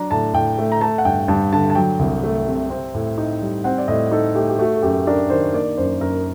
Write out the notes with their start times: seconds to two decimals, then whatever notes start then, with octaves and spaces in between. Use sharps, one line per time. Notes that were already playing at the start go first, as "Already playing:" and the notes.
Already playing: F#3 D4 A#5
0.11 A2 A5
0.34 A2 G5
0.58 A3
0.72 A#5
0.81 A3 A5
0.98 F#5
1.05 G2 G5
1.28 G2 A5
1.53 D3 A5
1.70 A5
1.75 F#3 G5
1.99 C2
2.23 A3
2.47 C3
2.70 C4
2.94 A2
3.18 D#4
3.42 G3
3.64 C4 F#5
3.78 D5
3.88 A2 D#5
4.11 D#4 A4
4.35 A3 G4
4.49 G4
4.59 A3 F#4
4.76 A4
4.83 F#2 G4
5.07 D4 A#4
5.30 D#3 C5
5.53 A#3 D5
5.77 F#2 C5
6.00 F#2 A#4